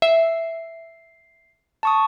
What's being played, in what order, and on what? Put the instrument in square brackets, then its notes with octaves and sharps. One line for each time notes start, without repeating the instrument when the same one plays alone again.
[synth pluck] E5 [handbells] C7
[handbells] A5 C#6 D#6